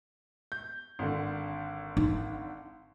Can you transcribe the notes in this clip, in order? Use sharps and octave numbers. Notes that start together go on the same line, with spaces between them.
G6
G#1 D3
D#4